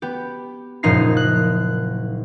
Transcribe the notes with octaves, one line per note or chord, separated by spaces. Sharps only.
B3 G4
F#1 A#2 F3 D#4 A#5 C7
F#6